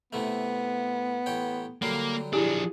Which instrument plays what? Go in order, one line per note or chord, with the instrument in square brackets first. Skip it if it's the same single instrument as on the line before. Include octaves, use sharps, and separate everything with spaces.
[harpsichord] C3 E3 A3 [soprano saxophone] B3
[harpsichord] A1 C#5 G5
[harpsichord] D3 F#3 G3 [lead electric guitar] A#3
[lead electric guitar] F3 D4 [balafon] E4 G4 [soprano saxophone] G#4